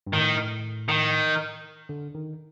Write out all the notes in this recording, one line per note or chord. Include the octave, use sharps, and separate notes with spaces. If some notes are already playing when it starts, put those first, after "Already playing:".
G2
A2 D#3
D#3
D3
D#3